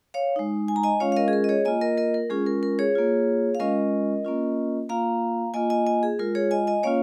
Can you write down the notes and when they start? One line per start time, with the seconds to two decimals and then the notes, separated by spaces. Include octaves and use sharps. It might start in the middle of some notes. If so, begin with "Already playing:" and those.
0.14 C#5 F5
0.36 G#3 D#4
0.68 G#5
0.76 A#5
0.83 D#5 G#5
1.00 G#3 C#4 F4 C#5 F5
1.12 F5
1.16 A#4 D#5
1.28 G#4
1.33 A#4
1.44 D#5
1.49 G#4 C#5
1.65 A#3 F4 D#5 G#5
1.81 A#4 D#5
1.98 A#4 D#5
2.14 A#4
2.30 G#3 C#4 F4 G#4
2.46 A#4
2.63 A#4
2.79 G#4 C#5
2.95 A#3 F4
3.55 F5
3.59 G#3 C#4 F4 A#4 D#5
4.25 A#3 C#4 F4
4.89 A#3 F4 F5 A#5
5.54 A#3 F4 D#5 G#5
5.70 D#5 G#5
5.87 D#5 G#5
6.03 G#4
6.19 G#3 F4 A#4
6.35 G#4 C#5
6.51 D#5 G#5
6.67 D#5 G#5
6.83 A#3 C#4 F4 C#5 F5